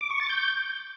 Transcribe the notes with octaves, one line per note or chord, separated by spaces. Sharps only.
D6
C#6
A6
G6